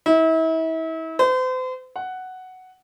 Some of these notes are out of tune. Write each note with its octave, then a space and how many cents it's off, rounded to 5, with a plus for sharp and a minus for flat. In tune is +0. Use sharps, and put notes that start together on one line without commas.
E4 -35
C5 -40
F#5 +5